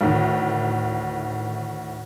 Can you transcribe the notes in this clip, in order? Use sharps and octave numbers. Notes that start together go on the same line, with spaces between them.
D2 A2 D#3